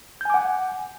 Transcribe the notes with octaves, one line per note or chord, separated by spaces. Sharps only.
F#5 G#5 D6 G6